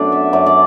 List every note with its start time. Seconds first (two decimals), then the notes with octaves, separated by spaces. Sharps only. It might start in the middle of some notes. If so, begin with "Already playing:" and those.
Already playing: F#2 A3 B3 D4 D5
0.12 E5
0.33 F#2 D5
0.46 D5